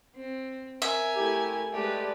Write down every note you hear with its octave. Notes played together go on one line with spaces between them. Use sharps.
C4
A#4 E5 G#5
A3 E4 G4
G#3 A3 G4 B4 D5